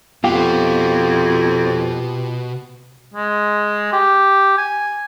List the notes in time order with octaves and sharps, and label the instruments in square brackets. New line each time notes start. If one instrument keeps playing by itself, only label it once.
[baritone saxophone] F2 [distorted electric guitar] B2 [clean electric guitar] F4 G4
[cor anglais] G#3
G4
G#5